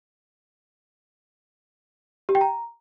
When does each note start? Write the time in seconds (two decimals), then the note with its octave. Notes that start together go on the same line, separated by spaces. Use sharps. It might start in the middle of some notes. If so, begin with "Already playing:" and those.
2.29 G4
2.35 G5
2.41 A#5